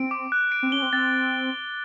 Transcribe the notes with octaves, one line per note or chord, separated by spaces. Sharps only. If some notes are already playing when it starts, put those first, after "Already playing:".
Already playing: C4 D7
D6
F#6
D7
C4
C#4 G7
C4
C4 A6